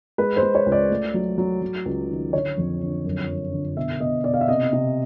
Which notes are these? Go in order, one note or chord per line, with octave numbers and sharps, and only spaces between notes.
G#3 B4
C5
G#3
C#5
C#2
D5
A3
F#3
F#3
F#3
C#2
D#3
D3 C#5
F2
D3
F#2
F#2
D3
B2 E5
B2 D#5
B2 D5
F5
E5
C3 D#5
C3